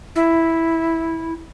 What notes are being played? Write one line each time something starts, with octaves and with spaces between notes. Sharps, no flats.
E4